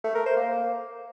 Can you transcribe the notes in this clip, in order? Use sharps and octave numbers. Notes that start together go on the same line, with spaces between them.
A3
A#4
C5
A#3